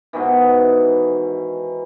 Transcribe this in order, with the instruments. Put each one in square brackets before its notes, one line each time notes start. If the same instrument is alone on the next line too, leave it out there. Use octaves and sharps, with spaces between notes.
[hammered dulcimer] G#2 B2 D#3 E3